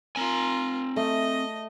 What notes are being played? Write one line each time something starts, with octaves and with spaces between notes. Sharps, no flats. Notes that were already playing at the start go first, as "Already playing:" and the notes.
C4 F4 A#4 G#5
A3 D#5